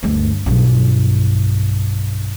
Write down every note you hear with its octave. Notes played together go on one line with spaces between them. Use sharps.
D2 G2
B1 G2